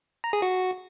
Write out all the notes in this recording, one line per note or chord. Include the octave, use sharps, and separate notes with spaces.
A#5
G#4
F#4